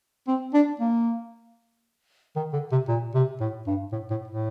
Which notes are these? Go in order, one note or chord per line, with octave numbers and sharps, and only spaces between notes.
C4
D4
A#3
D#3
D3
C3
A#2
C3
A2
G2
A2
A2
A2